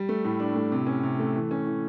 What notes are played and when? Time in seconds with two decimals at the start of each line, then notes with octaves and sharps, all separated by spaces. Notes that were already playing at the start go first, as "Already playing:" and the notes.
Already playing: G3
0.09 A3
0.25 A2
0.40 D4
0.55 A2
0.72 C3
0.87 C#4
1.03 C3
1.19 A3
1.35 E3
1.51 C#4
1.67 E3